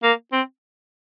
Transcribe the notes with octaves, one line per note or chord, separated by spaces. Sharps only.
A#3
C4